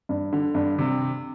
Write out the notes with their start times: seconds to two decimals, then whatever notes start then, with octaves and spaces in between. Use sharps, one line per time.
0.09 G2
0.33 D3
0.55 G2
0.78 C3